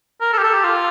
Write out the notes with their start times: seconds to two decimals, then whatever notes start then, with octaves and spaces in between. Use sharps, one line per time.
0.21 A#4
0.33 A4
0.38 G4
0.43 A4
0.53 G4
0.64 F4